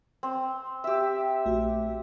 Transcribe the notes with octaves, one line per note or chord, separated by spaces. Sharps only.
C4
G4 E5
A#1 A3 F#4